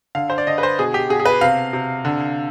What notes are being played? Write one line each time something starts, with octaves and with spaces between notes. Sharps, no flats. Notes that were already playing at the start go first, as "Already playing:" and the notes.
D3 F5
C5
D5
D3 D#5
B4
C5
B2 G#4
G4
B2 G#4
G#4
B4
C3 F5
C3
D3